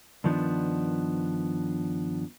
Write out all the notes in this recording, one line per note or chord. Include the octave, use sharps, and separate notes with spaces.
G2 D#3 F3 B3 D4